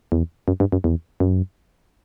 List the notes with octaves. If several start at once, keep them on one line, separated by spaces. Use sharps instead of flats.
E2
F#2
G2
F#2
E2
F#2